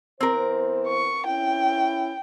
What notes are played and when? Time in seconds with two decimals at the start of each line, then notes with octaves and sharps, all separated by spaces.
0.21 E3 B3 C4 A#4 C5
0.88 C#6
1.27 C#4 E4 G5